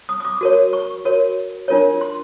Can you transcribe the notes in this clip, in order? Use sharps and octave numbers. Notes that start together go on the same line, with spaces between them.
D#6
D#6
D6
F#4 A#4 C#5
C#6
F#4 A#4 C#5
D4 F4 A#4 C#5
C6